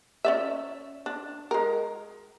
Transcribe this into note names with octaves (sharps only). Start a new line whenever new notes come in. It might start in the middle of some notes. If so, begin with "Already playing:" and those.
C#4 D5 E5
D4
G#3 A#4